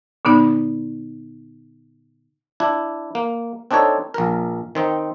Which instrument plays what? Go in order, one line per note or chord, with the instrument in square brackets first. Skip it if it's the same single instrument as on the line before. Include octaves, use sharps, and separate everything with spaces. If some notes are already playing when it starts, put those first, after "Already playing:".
[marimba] A#2 D3 B3 D#4
[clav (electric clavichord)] D4 E4
A#3
C4 D4 D#4 A4 C#5
A#1 A#4
D#3 C4 D#4